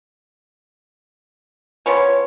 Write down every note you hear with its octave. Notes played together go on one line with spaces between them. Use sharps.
F3 B3 C#4 C#5